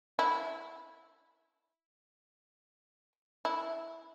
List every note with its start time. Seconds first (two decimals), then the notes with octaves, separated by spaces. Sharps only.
0.19 E4
3.45 E4